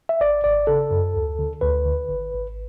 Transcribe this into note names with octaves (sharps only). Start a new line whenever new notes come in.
E5
G#1 D5
G#1 D5
C#3 A4
F#2
D2
D3
D2 B4
D3
G#1
G#1